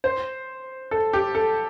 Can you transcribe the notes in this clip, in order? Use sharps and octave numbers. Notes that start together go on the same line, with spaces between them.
C5
A4
G4
A4